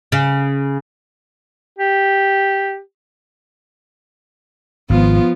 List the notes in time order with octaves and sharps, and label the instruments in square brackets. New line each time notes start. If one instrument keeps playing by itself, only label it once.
[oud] C#3
[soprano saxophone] G4
[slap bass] G#1 [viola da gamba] F3 B3 F4